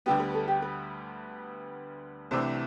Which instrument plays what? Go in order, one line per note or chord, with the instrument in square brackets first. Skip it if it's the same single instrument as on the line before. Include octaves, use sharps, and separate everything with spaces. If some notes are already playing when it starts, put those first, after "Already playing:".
[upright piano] D2 D3 G3 B3 [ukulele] G4
[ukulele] B4
A4
G4
B4
[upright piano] C2 C3 E3 A3 D4 [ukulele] C5